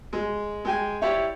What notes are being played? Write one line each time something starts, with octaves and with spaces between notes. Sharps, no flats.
G#3
G#3 G5 G#5
E4 G4 C#5 D5